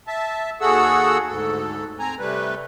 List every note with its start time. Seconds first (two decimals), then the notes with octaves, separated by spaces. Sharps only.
0.07 E5 A5
0.61 D#2 F#4 G#4 A4 F#5 E6
1.28 D2 G#2 A4
1.99 C4 G#5 A#5
2.19 C3 G3 A3 B4